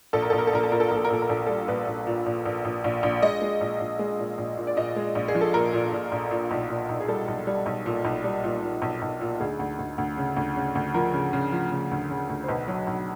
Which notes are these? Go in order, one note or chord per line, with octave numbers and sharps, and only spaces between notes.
A#1 A4
A#4
A#1 A4
A#4
A4
A#1 A#4
A4
A#2 A#4
A4
A#1 A#4
A4
A#4
A#1 A4
A#4
A#1 A4
A#4
G3 A4
A#1 B4
A#1
A#2
A#1
A#1
A#1
A#1
A#1
G#3 D#5
G#3
A#1
A#1
G#3
A#2
A#1
A#2
D5
A#2 D#5
G#3
A#1
G#4
F3
A4
A#2 A#4
A#2
A#2
A#1
A#2
B1
A#2
B1
G#4
G3 A4
B1
G3
B1
A#2
B1
G3
A#2
A#2
B1
B1
A#2
D2 G#4
D2
D2
D2
C#3
D2
C#3
D2
F3 A#4
C#3
C#3
F3
C#3
D2
C#3
D2
C5
B1 B4
F#3
B1